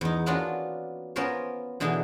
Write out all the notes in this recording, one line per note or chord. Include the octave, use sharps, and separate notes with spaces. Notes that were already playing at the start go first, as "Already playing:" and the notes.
E2 D#4
A#3 B3 C#4 D4 F4 F#4
B3 C#4 F4 A#4 C5 C#5
B2 D3 E3 D#4 G#4